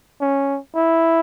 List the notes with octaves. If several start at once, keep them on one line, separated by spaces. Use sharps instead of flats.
C#4
E4